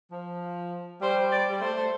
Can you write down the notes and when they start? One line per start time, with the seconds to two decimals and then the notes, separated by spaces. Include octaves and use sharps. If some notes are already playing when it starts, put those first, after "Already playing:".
0.12 F3
1.01 G3 C5
1.32 D5
1.50 G3
1.61 A3 C5
1.77 A3